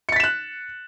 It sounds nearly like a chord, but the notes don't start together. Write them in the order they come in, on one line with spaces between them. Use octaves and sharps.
C#7 A6 B6 E7 F#6